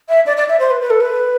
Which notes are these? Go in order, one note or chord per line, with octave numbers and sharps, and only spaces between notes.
E5
D5
D5
E5
C5
B4
B4
A4
B4